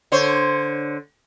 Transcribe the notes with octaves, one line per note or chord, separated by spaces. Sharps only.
D3 C5 C#5